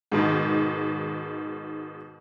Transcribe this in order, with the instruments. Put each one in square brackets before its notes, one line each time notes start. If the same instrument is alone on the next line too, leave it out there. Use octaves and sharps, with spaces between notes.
[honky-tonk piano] G#2 B2 D#3